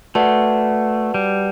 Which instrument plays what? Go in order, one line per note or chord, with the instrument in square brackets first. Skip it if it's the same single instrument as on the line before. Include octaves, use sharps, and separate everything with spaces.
[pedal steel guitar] A3 [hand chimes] F#4 B4 D5 F#5 A5
[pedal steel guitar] G3